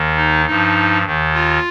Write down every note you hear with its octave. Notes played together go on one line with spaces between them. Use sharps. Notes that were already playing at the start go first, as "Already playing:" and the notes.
Already playing: D#2 D#3
D#4
G2 F3 D#4
D#2 D#3
F4